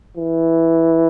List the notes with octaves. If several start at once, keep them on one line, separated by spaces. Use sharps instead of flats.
E3